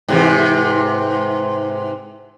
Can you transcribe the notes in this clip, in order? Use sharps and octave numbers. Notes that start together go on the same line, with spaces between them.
G#2 C3 E3